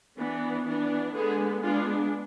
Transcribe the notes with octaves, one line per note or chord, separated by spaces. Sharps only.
E3 B3 D4
E3 B3 D4
D3 G#3 B3 G#4
G#3 B3 D4 F4